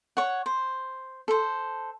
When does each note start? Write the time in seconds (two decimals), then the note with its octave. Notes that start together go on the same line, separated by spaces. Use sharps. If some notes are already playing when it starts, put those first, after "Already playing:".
0.17 C#5 F#5
0.46 C5
1.28 A4 C5